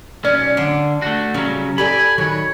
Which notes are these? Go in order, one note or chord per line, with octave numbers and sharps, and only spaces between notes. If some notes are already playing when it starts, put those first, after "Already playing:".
B1 C#4 D5
D3 D4
A3 F#4
C#3 F#3 G3 C#4
G4 A4 D5 G#5 B5
D#3 F#3 F#4 C#5